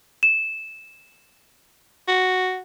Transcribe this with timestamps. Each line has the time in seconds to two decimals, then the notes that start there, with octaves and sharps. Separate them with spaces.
0.23 E7
2.08 F#4